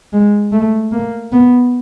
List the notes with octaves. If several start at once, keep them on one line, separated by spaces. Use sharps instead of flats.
G#3
A3
A#3
B3